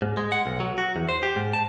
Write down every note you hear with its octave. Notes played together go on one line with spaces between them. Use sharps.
G#2
G#3
F#5
B1
F#3
F#4
E2
C5
G4
G#2
A5